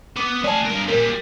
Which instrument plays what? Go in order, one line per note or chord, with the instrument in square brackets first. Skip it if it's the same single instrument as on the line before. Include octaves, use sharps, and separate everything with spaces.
[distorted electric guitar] B3 [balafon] D6
[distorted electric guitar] A3 G#5 [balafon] D5 A5
[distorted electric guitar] G2 A#4
[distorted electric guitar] A#2 G3 [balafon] A#4